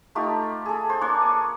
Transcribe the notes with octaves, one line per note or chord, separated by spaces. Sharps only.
A3 D#4 F4 G4
G#4 A4
C5
A#3 D4 C#5
C6 D#6